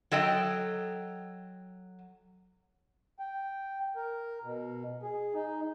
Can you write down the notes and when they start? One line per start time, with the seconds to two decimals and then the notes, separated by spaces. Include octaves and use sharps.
0.12 F#3 A4 D#5 G5
3.19 G5
3.96 A#4
4.43 B2
5.03 G#4
5.35 D#4